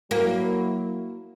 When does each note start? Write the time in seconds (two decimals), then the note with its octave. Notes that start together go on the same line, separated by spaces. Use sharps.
0.11 F#3 A#3 E4